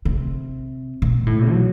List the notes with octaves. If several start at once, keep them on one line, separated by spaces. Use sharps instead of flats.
C3
B2
A2
F#3